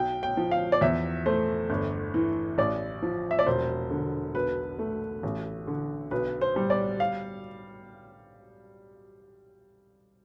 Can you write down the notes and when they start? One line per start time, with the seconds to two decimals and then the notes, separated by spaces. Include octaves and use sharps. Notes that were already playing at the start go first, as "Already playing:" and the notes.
Already playing: B1 G5
0.23 G5
0.37 F3
0.51 F5
0.72 D5
0.81 E2 E5
1.26 A3 C5
1.70 G1
2.14 E3
2.58 A1 D5
3.02 F3
3.31 E5
3.39 D5
3.46 E1 C5
3.91 D3
4.35 B1 B4
4.79 A3
5.23 A1
5.67 D3
6.11 B1 B4
6.41 C5
6.56 G3
6.70 D5
7.00 F5